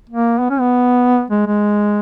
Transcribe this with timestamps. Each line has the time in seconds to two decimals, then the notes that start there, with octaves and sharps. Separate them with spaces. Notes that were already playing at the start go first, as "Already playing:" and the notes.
0.10 A#3
0.40 B3
0.50 C#4
0.60 B3
1.30 G#3
1.46 G#3